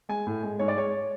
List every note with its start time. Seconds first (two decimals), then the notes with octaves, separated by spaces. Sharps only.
0.09 G#3 G#5
0.27 A2
0.43 G#3
0.59 G#2 C#5
0.68 D5
0.76 G#3 C#5